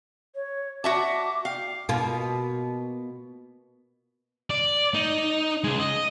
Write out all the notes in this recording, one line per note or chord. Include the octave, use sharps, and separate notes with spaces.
C#5
F#4 E5 A5 D6
F5 G5
B2 A#3 F4
D5
D#4
C#3 G#3
D#5